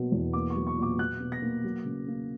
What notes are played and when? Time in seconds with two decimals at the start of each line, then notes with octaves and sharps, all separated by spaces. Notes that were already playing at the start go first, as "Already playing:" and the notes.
Already playing: B2 F#3 A#3
0.12 E2
0.33 A#3 D6
0.50 C#6
0.56 F#3
0.67 C#6
0.77 A#2 D6
0.98 F#3 F#6
1.20 B2
1.32 A#6
1.42 A#3
1.64 F#3
1.85 C#3
2.08 A#3